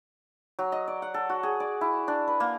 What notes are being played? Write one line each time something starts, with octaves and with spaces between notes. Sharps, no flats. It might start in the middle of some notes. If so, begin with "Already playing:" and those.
F#3
D#5
D5
F#5
A4
F#4
G#4
D5
E4
D4
B4
A#3